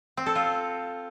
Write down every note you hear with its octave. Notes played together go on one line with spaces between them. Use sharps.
C4
A4
F4